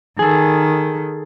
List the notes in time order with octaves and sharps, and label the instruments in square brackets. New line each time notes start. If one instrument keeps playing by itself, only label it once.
[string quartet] D#3 [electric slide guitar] G#4 A4